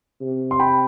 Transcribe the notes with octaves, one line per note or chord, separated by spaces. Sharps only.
C3
C6
G5 B5